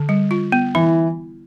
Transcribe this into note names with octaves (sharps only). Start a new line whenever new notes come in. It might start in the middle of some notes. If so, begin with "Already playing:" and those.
Already playing: D3
G3
F4
B3
E3 E4